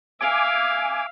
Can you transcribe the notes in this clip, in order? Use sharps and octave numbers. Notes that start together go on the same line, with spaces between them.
E5 F5 G#5 D6